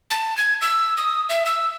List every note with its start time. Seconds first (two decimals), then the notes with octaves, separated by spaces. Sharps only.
0.10 A5
0.37 G#6
0.61 E6
0.97 D#6
1.29 E5
1.46 E6